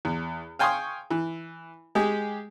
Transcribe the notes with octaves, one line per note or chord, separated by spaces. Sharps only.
E2
F5 G5 G#5 C6 C#6 D#6
E3
G#3 G4 G#4